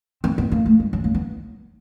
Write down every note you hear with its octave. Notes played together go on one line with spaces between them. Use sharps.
C4
B3
A#3
A3
G#3
F#3
A#3
B3